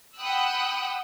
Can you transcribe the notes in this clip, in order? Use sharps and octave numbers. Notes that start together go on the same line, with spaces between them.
F#5 G5 B5 D#6 E6 F#6